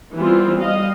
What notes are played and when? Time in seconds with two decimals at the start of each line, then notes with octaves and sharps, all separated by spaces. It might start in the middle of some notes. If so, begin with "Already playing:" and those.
0.15 E3 G3 B3 C4 F4
0.61 G3 D#5 F5